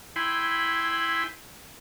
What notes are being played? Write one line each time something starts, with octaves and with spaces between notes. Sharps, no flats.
E4 G5 G#5 B5 C6